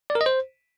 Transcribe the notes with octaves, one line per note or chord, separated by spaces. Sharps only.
D5
A#4
D#5
C5